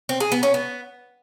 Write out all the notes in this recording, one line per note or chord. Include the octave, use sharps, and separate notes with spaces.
C4
G#4
B3
C#4
B3